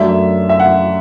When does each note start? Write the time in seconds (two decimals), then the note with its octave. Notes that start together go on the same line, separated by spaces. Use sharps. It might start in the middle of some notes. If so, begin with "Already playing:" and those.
Already playing: F#2 F#3 A3 D4 E5
0.49 E5
0.60 F#5